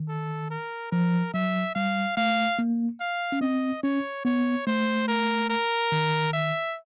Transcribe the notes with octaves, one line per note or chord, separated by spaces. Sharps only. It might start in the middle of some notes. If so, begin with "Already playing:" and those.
Already playing: D#3
A4
A#4
F3 A#4
F#3 E5
G3 F5
A3 F5
A#3
F5
C#4
C4 D#5
C#4 C#5
B3 C#5
A3 C5
A#4
A#4
D#3
E5